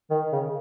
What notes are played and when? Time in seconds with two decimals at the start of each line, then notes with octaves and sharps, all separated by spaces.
0.11 D#3
0.32 C#3